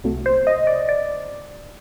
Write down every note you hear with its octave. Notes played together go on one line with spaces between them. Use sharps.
C2 C3 F#3 A3
C5
D#5
D5
D5